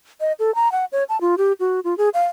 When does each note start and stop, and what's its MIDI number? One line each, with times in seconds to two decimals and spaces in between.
0.21 0.32 75
0.39 0.54 69
0.55 0.71 82
0.72 0.85 78
0.92 1.04 73
1.09 1.20 81
1.21 1.38 65
1.38 1.53 67
1.60 1.80 66
1.84 1.97 65
1.98 2.09 68
2.14 2.25 77